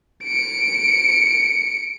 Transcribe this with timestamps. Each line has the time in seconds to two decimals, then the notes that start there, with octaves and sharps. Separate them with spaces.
0.24 C#7 D7